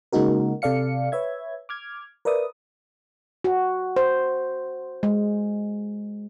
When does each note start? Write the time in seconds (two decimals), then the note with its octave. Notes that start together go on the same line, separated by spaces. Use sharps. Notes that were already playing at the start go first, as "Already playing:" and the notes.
0.13 C#3 G#3 A#3 D#4 F#4 A#4
0.62 C3 A4 D5 F5 C#7
1.12 B4 C#5 E5 G#6
1.69 D6 F6 G#6
2.25 A#4 B4 D5 E5 D#6
3.44 F#4
3.96 C5
5.03 G#3